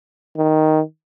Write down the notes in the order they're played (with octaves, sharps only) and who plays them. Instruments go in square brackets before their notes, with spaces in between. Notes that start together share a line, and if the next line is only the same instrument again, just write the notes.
[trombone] D#3